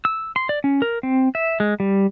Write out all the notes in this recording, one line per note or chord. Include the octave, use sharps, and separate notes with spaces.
E6
C6
D5
C#4
A#4
C4
E5
G#3
G3